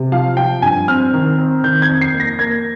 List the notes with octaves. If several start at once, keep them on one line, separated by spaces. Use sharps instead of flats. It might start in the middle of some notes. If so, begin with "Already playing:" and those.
Already playing: C3
F3 F5
F3 G5
G2 G#5
C4 F6
D#3
C4
D#3 G6
G#6
F2
C7
A#3
A#6
A#3 G#6